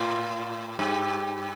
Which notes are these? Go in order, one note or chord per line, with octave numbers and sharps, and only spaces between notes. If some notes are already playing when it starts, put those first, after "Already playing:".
Already playing: A2 F4
G2 G4